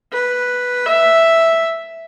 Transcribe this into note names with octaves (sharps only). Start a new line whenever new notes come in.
B4
E5